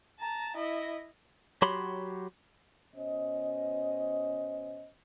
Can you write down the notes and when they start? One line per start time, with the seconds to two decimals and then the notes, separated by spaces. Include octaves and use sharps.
0.20 A5 A#5
0.56 E4 D#5
1.62 F#3 F#4 G4 C#5 B5 C6
2.95 B2 C#4 C5 D#5